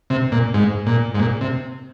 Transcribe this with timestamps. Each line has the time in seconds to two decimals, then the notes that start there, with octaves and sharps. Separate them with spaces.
0.10 C3
0.32 A#2
0.54 G#2
0.86 A#2
1.14 G#2
1.20 A#2
1.41 C3